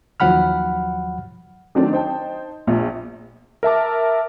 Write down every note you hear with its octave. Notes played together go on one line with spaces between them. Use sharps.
D#2 F3 F#3 F#5 B5 F6
D#3 F#3 A3 C4 D4
D#4 C5 G5 A5
A#1 F4
A#4 E5 A5 D6